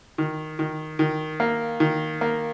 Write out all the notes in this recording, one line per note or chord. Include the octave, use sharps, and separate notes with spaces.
D#3
D#3
D#3
A#3
D#3
A#3